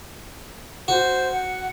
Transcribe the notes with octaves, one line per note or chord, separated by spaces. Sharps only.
F#4 C5
F#5